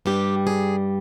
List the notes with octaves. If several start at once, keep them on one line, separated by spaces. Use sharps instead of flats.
G2 G3 G4
G#4